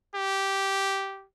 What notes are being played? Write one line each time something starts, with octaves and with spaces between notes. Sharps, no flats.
G4